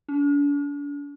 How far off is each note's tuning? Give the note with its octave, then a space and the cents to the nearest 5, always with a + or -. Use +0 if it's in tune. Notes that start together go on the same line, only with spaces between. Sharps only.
D4 -40